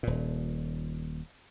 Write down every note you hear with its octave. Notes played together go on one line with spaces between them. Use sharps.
D#1 A#2